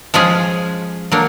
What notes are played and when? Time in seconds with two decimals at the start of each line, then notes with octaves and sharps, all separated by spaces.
0.14 F3 G#3 C#4 F4 G#4
1.12 F#3 A#3 D4